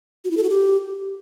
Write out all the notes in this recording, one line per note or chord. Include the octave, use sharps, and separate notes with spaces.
F#4
E4
A4
F#4
G4